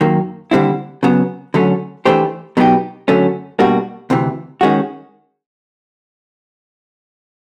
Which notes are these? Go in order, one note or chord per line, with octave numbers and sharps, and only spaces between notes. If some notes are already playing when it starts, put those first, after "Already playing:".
F#2 D#3 F#3 A#3
D#2 D3 G3 C4 E4
C#3 F#3 B3
D3 F#3 A3 C#4
E3 A3 D4 G4 C5
B2 F#3 B3 D#4 G4
F#2 D3 F#3 A3 C#4
B2 G3 A#3 D4 F#4
D2 C3 E3
D#3 G#3 C#4 F#4